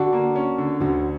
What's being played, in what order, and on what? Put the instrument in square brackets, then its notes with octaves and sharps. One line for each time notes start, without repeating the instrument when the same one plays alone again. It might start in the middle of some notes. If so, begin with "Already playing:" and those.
Already playing: [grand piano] D3 [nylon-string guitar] D4 F#4
[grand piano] A#3
C#4
D3
[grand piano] D2 [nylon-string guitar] D4 F#4